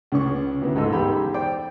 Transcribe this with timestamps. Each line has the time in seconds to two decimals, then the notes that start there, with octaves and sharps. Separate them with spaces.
0.12 C#2 C#3 C#4 C#6
0.62 D2 B3 E4
0.75 C#2 G#2 A4 D#5 E6
0.93 E2 G#2 G4 B5
1.34 C5 D5 G5